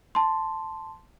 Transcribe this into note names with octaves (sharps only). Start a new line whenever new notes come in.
A5 C6